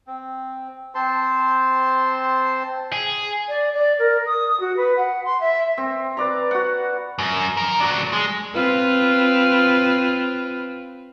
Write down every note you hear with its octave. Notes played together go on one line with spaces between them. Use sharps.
C4
C4 C5 A5 C6
G#4
D5
D5
A#4
D#6
F#4
B4
F#5
C6
E5
C4
B4 D5 A#5
F#4 F#5
F#2
D#3 A#4
F#3 D4
G#3
C4 F4 B4